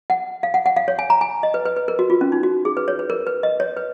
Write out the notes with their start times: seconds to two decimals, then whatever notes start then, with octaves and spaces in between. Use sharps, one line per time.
0.10 F#5
0.43 F5
0.54 F#5
0.66 F#5
0.76 F5
0.88 C#5
0.99 G#5
1.10 A#5
1.21 G#5
1.43 D#5
1.54 B4
1.66 B4
1.76 B4
1.88 A#4
1.99 F#4
2.10 F4
2.21 C#4
2.32 D#4
2.43 F#4
2.65 G#4
2.77 B4
2.88 C#5
2.99 B4
3.10 A#4
3.27 B4
3.43 D#5
3.60 C#5
3.77 B4